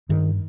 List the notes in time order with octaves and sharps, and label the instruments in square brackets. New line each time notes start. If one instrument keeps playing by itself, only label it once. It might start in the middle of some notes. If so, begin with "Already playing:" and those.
[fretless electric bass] G2 D#3